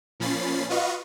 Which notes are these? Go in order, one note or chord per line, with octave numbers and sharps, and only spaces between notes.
A#2 F3 C#4 B5 A6 C7
F4 F#4 B4 D#5 F5 C#6